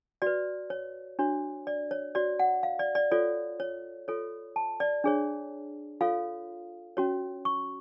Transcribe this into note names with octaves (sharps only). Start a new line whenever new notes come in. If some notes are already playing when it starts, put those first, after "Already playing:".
F#4 B4 D5
C#5
D4 F#4 C#5
D5
C#5
F#4 C#5 D5
F#5
F5
D5
D5
F4 A4 C#5 D5
C#5
F4 A4 C#5
A5
D5
D4 G#4 C#5
F4 A4 C#5 F5
C#4 F#4 C#5
C#6